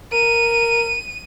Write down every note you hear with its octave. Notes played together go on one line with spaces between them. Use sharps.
A#4 D#7